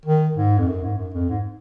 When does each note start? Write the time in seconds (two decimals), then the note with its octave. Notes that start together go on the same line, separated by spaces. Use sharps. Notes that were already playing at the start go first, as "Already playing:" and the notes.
0.05 D#3
0.37 G#2
0.58 F2
0.68 F#2
0.83 G#2
0.98 F#2
1.14 F2
1.29 G#2